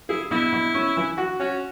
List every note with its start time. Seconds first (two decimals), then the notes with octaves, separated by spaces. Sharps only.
0.09 E4 G#4
0.31 B2 E4
0.52 B2
0.74 C#4
0.97 E3
1.17 F#4
1.40 C#4 F#4